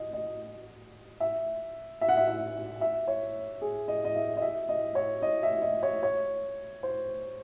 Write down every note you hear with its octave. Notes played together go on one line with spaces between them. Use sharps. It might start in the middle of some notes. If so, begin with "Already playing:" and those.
Already playing: D#5
D#5
E5
E5
F#5
E5
E5
E5
C#5
G#4
D#5
D#5
E5
D#5
E5
D#5
C#5
D#5
E5
D#5
C#5
C#5
C5